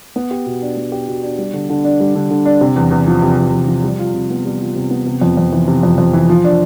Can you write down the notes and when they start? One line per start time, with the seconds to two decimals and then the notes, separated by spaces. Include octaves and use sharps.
0.16 B3
0.31 G4
0.46 B2
0.62 D4
0.77 B3
0.92 G4
1.08 B2
1.23 D4
1.38 G3
1.54 D3
1.70 D3
1.84 D4
2.00 G3
2.15 D3
2.31 D3
2.45 D4
2.61 C3
2.76 E2
2.91 E2
3.07 F3
3.22 C3
3.38 E2
3.53 E2
3.68 F3
3.84 G3
3.99 F4
4.14 C3
4.30 B3
4.45 G3
4.60 F4
4.76 C3
4.91 B3
5.06 C3
5.21 F2
5.37 F2
5.52 E3
5.68 C3
5.83 F2
5.98 F2
6.13 E3
6.29 F3
6.44 D4